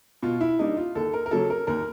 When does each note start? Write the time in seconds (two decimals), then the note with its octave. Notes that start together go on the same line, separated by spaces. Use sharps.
0.23 B2 F4
0.41 E4
0.59 G3 A#3 D4 D#4
0.77 F4
0.95 D#2 A4
1.14 A#4
1.26 A#4
1.31 C#3 F#3 A#3 C#4 A4
1.50 A#4
1.67 D#2 A#4